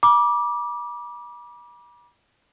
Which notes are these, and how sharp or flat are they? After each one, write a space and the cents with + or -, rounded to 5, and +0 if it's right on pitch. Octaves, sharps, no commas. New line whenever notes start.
B5 -40 D6 +0